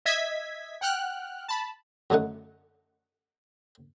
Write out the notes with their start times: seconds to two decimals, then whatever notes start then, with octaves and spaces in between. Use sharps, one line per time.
0.05 D#5 E5 G#6 B6
0.81 F#5 G5 F6 F#6
1.48 A5 B5
2.10 F#2 D3 A3 D#4 F#5